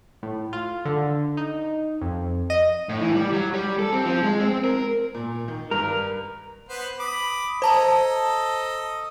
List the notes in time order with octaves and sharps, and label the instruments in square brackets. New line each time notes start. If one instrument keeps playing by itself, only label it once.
[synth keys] A2
F4
D3
D#4
F2
D#5
[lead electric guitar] A2
E3
G3
F#3
G3
A4
C4
F3
G#3
C4
A#4
[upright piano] A#2
D#3
[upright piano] G2 [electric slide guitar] A#4
[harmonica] B3 B4 C5
B5 D6 D#6
[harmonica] A4 D#5 [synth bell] C5 A5 A#5